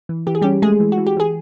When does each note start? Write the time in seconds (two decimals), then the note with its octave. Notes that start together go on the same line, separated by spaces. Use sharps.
0.09 E3
0.27 E3 G4
0.35 G#4
0.42 G3 C#4 G4
0.62 G#3 A3 G#4
0.80 E3
0.92 F#4
0.98 E3
1.07 G4
1.17 E3 G#4